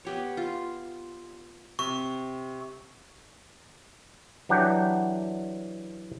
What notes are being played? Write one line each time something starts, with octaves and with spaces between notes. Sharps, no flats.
B3 G4 C#5
F4
C3 C#6
E3 F#3 D4 G4 F#5 G5